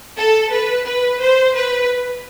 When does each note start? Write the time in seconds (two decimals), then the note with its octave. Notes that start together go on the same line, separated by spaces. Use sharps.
0.18 A4
0.52 B4
0.86 B4
1.20 C5
1.55 B4